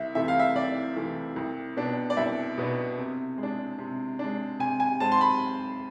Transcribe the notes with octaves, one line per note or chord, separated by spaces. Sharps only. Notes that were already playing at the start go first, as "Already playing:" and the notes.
Already playing: C2 E5
C3 E3 A3 E5
F5
E5
C2 D5
C3 E3 A3
C2
B2 B3 D4
D5
C2 E5
B2 B3 D4
C3
G#3
D4
C3
G#3 D4
C3 G#5
G#5
G#3 C4 A5
C6
B5